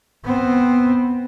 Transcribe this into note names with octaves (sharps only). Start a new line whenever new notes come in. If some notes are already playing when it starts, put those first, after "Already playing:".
B3 C4